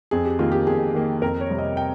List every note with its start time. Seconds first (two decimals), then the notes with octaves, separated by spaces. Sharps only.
0.11 F2 G#4
0.25 G4
0.39 D#3 A#3 F4
0.52 G4
0.67 F2 G#4
0.94 D#3 A#3
1.22 F2 A#4
1.41 C#5
1.49 C3 G3 C4
1.58 D#5
1.77 G5